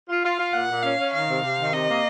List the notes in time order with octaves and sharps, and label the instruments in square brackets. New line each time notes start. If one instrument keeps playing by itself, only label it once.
[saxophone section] F4
[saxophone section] F4 [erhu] F5
[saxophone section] F4
[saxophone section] A#2 [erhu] F#5
[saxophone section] A#2
[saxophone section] C#4 [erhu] F5
[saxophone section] C#4
[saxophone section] D#3 [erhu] F5
[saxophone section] C3
C3
D#3
[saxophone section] C3 [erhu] D#5
[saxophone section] A#3